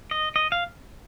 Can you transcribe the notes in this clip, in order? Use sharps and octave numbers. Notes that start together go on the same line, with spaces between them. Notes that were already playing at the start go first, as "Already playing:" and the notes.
D#5
D#5
F5